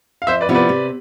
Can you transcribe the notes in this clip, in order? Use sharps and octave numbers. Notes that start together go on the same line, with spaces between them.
F5
F2 C5 E5
B4 D5
C3 F3 B3 E4
B4 D5
C3